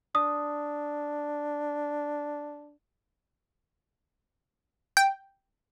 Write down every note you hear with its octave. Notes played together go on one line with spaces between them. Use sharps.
D4 D#6
G5